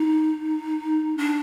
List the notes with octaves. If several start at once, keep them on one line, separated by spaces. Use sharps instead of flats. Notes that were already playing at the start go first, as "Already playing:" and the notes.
Already playing: D#4
D4